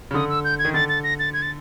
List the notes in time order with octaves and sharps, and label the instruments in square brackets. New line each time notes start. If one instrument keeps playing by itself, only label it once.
[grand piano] C#3
[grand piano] D3 [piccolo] D#6
[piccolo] E6
G6
G#6
[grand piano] D#3
[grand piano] D3 [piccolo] A6
[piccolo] A6
A#6
A6
G#6
A6